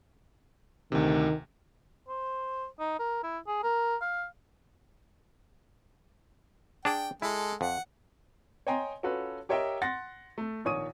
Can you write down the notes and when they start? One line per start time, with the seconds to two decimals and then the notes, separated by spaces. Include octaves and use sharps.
0.92 D2 C3 D#3
2.08 C5
2.79 D#4
2.99 A#4
3.23 E4
3.47 G#4
3.64 A#4
4.01 F5
6.85 D4 G#4 D5 G5
7.22 G#3 E4 A4
7.61 F2 F#5
8.67 C#5 D#5 G5 G#5 A#5 C6
9.03 C#4 F4 F#4 A4 B4
9.49 G4 A#4 C#5 D#5 E5 G5
9.82 F#5 C6 A6 A#6
10.38 A3
10.65 A#1 D#3 C#5 C#6 D#6 D#7